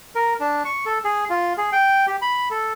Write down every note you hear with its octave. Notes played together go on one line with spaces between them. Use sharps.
A#4
D4
C#6
A4
G#4
F4
G#4
G5
G4
B5
A4